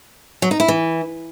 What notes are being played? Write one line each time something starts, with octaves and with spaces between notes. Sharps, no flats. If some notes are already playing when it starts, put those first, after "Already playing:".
F#3
D#4
E4
E3